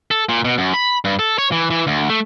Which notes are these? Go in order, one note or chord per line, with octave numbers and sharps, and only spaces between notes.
A4
A#2
B2
F#2
B5
G2
A4
C#5
E3
E3
D2
A3